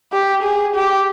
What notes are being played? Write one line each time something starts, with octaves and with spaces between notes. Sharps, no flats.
G4
G#4
G4